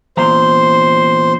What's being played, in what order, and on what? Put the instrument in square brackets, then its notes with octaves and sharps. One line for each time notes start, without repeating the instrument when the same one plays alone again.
[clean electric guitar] E2 A#2 A#5 [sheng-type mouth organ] C5